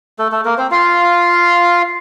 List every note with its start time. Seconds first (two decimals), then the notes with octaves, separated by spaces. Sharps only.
0.19 A3 A4
0.32 A3 A4
0.45 A#3 A#4
0.58 C4 C5
0.71 F4 F5